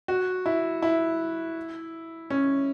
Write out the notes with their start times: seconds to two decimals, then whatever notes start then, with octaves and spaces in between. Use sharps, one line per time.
0.08 F#4
0.46 E4
0.82 E4
2.30 C#4